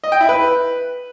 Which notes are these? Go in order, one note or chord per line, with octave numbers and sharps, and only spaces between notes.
D#5
G5
E4
B4